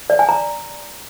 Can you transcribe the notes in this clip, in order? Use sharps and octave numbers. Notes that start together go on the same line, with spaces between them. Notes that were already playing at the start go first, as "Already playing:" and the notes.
D5
G#5
A#5